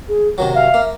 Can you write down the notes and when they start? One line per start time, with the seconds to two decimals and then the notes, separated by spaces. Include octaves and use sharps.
0.08 G#4
0.38 C3 D#3 F#3 C#5
0.54 E5 F5
0.74 A#3